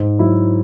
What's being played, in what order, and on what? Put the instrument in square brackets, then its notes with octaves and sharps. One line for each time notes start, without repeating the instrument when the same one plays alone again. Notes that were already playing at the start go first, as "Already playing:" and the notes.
Already playing: [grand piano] G#2
F#3 E4